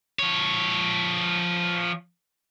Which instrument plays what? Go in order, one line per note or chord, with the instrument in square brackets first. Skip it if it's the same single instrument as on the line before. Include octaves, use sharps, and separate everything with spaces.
[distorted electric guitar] F3 C#5